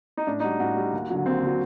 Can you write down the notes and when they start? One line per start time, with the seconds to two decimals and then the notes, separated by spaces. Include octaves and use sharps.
0.17 D#4
0.27 A2 D4
0.40 D#4
0.44 G3 F#4
0.60 A2 F#4
0.77 G3
0.93 D#2
1.10 D3 F#3
1.26 D#2 C4
1.42 D3 F#3